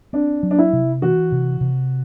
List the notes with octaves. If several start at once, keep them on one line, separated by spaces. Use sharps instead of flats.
C4 D4
F#3
D4
E4
C3
E3 F#4
C3
C3